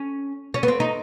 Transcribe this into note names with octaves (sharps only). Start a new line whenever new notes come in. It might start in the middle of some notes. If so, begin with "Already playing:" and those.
Already playing: C#4
C#4
B3
C4
D#4